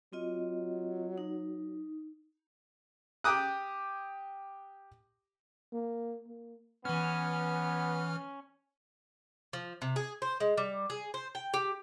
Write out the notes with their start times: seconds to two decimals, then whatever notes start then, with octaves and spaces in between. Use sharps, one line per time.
0.13 F#3 C4 F4 D#5
1.18 D#4
3.24 G4 G5 D6 D#6 F#6
5.73 A#3
6.28 A#3
6.85 E3 B3 C#4 F6
9.53 F3
9.82 C3
9.96 G#4
10.22 C5
10.40 G#3
10.57 G3
10.90 G#4
11.14 C5
11.35 G5
11.54 G4